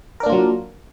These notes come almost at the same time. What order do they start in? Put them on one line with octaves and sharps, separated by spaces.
A#4 D4 A#3 F4 F#3